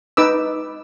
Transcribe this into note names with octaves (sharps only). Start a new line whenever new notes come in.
D#4 B4 D6 E6